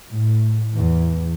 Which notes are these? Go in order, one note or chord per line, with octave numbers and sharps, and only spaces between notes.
A2
E2